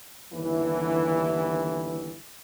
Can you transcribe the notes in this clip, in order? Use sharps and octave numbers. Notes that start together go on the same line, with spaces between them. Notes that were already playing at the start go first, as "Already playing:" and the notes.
G1 D#2 D3 E3